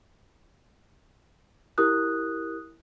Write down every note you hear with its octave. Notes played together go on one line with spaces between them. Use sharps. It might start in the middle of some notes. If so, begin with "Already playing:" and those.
E4 G4 A#4 D#6 F#6